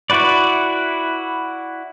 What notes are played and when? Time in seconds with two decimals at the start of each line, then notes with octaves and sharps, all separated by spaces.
0.10 E4 F#4 B4 D5